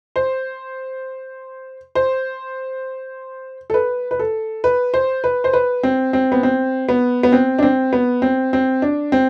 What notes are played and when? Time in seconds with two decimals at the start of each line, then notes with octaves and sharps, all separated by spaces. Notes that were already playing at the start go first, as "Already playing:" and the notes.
0.16 C5
1.95 C5
3.70 A4
3.74 B4
4.11 B4
4.19 A4
4.64 B4
4.94 C5
5.24 B4
5.44 C5
5.53 B4
5.83 C4
6.13 C4
6.32 B3
6.43 C4
6.89 B3
7.23 B3
7.32 C4
7.59 D4
7.63 C4
7.93 B3
8.22 C4
8.53 C4
8.82 D4
9.12 C4